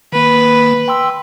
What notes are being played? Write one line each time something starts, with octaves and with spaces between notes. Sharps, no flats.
D#3 A#3 B4
G5 C6 E6